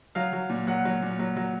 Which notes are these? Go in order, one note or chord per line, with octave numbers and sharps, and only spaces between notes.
F#3 F5
F#3
A#2
F#3 F#5
F#3
A#2
F#3
F#3